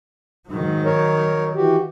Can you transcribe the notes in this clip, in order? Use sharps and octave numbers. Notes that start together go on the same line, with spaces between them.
G#2 D#3 F#3
A#4 C#5
E3 F#4 G4